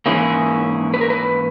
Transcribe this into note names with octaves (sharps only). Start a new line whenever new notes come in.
G#2 E3 A#3 C#4 E4 G#4
B4
A#4
B4